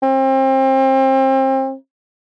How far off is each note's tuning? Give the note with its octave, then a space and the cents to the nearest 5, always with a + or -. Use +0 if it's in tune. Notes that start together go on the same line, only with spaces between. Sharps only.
C4 +30